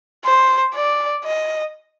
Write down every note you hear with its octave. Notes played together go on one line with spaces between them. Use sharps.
C5
D5
D#5